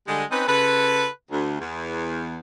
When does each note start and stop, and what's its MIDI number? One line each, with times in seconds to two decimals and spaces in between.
0.08 0.24 50
0.08 0.24 55
0.08 0.24 56
0.31 0.48 60
0.31 0.48 61
0.31 0.48 63
0.31 0.48 71
0.48 1.07 49
0.48 1.07 65
0.48 1.07 69
0.48 1.07 71
1.31 1.57 38
1.60 2.38 40